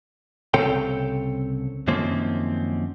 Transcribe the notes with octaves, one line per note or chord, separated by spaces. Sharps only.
C2 C#3 C4 A4 C#5 G5
F#2 D#3 F3 A#3 C4 C#4